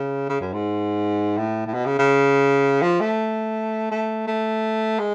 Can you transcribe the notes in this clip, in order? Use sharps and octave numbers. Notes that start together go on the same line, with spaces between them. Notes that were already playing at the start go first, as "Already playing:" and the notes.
Already playing: C#3
C#3
F#2
G#2
A2
A2
B2
C#3
C#3
F3
A3
A3
A3
G#3